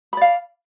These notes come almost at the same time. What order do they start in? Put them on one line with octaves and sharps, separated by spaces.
B5 D5 F5